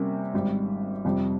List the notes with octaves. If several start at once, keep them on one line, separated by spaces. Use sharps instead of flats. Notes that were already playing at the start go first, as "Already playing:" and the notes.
Already playing: C3 G3 A#3 C#4
G#1 G#2 G3
F2 C3 G3